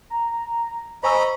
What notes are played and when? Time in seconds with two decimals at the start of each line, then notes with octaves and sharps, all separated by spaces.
0.10 A#5
1.03 C5 D#5 G#5 A#5 B5 C#6 E6